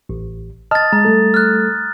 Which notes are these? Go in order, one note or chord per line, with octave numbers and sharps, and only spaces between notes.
A1
D#5 A5 D#6 F6 A6
G#3 A#5
G3 A3 A4
F6 F#6